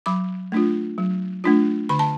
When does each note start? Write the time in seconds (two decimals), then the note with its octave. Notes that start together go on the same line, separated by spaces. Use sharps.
0.06 F#3 B5 D6
0.52 A3 D4 F4
0.98 F#3
1.44 A3 D4 F4
1.89 D3 B5
1.99 A5